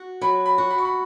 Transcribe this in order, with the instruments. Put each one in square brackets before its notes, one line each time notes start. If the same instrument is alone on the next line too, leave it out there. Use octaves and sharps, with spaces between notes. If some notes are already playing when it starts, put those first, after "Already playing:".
Already playing: [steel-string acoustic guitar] F#4
[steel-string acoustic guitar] F#3 [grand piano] B5
[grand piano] B5
[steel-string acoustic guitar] F#4
[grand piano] B5
C#6
B5